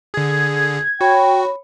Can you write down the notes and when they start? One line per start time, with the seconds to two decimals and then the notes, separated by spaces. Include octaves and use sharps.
0.14 D3 G#4 G#6
1.01 F#4 C#5 G5 B5